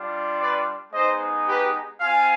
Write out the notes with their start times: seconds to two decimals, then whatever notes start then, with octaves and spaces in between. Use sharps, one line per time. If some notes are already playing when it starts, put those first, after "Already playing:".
Already playing: G3 D4 F4
0.38 B4 D5
0.92 G#3 B3 D#4 C5 D#5
1.47 G4 B4
2.01 C4 F4 F5 G#5